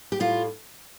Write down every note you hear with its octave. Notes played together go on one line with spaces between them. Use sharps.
G4
A2 F4